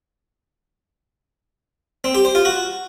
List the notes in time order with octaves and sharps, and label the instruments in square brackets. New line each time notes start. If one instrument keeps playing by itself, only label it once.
[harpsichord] C4
G4
C5
F4
F#4